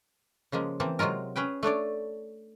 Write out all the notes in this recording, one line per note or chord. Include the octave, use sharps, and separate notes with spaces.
C#3 F3 G#3 A#3
E3 A#3 C4 A5
C3 F#3 G#3 F4 A#4
C#4 G#4 B4 G5
A3 D4 C#5 D5